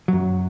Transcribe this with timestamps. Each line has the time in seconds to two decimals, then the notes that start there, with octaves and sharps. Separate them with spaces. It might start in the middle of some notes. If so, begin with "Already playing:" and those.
0.08 F#2 F#3